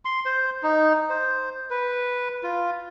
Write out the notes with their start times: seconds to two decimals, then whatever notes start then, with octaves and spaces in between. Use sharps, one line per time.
0.05 C6
0.25 C5
0.63 D#4
1.10 C5
1.70 B4
2.43 F4